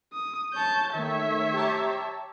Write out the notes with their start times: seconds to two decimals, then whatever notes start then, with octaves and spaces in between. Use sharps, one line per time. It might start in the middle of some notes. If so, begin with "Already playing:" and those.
0.12 D#6
0.53 C#5 A5 G6
0.94 D#3 A3 C#5 E5
1.53 G4 A5 A#5